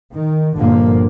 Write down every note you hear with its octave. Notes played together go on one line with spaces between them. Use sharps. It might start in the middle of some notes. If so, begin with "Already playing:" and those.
D#3
G1 G2 A#2 D3 F3 A#3